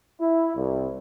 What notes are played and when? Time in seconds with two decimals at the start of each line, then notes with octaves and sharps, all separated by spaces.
0.19 E4
0.55 C2